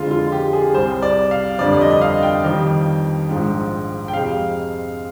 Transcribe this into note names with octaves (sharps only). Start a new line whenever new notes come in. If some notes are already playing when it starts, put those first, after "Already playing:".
Already playing: F2 D3 G#3 F4
F4
G4
G#4
C2 C3 G3 C5
D5
F5
G1 F2 D3 G3 D5
D5
D#5
D#5
F5
G5
F2 D#3 G3
A#1 G#2 F3
G5
F2 C3 F3 G#3 F5